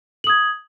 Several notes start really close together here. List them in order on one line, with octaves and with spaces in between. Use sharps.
F#7 D#6 G#6